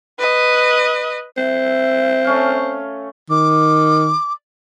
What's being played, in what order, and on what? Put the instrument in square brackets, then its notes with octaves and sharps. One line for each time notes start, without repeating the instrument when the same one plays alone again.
[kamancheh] B4 D#5
[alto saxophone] C4 [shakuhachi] E5
[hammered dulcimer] A3 C#4 F5
[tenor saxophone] D#3 [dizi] D6